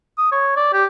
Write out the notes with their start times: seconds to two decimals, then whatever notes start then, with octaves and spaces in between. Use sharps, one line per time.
0.18 D#6
0.32 C#5
0.57 D5
0.73 G4